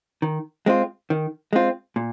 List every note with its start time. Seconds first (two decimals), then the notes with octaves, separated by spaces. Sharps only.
0.22 D#3
0.66 G#3 C4 F4
1.10 D#3
1.53 G#3 C4 F4
1.96 A#2